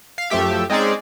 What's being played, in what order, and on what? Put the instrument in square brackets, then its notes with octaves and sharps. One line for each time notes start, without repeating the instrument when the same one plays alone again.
[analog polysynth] F5
F#2 F3 A3 G4 E5
G#3 C4 C#4 D#4 G#4 D5